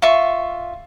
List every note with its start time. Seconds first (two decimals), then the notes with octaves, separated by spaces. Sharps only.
0.02 F4 E5 C#6